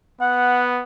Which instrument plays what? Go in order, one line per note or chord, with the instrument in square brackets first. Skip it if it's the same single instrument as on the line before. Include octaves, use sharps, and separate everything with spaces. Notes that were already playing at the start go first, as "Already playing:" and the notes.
[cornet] B3 [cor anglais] F#5